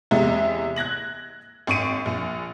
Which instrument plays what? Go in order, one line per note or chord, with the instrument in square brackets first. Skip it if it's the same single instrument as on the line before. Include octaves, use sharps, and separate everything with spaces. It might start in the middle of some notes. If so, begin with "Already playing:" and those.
[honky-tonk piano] E2 C3 G#3 E5
F#6 G#6 A#6 F#7
G#1 C#6 D#7
A#1